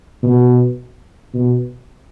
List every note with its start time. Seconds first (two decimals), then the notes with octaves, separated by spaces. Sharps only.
0.23 B2
1.34 B2